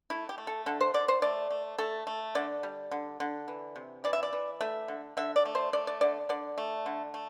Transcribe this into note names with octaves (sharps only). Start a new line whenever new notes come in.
A3 E4
G4
A3
A4
D3 A4
C5
D3 D5
C5
A3 D5
A3
A3 A4
A3
D3 D5
G3
D3
D3
E3
C3
E3 D5
E5
D5
E3
A3 E5
D3
D3 E5
D5
A3
C5
A3 D5
D5
D3 D5
D3 D5
A3
D3
A3